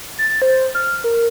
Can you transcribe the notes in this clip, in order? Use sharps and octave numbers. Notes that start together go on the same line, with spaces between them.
A6
C5
F6
A#4